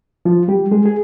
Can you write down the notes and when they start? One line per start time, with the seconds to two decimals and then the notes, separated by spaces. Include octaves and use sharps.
0.25 F3 F4
0.48 G3 G4
0.71 G#3 G#4
0.86 G#4